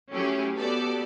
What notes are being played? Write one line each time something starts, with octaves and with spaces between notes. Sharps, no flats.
F#3 A3 C#4 E4 G4 G#4
B3 F#4 G4 A4 D5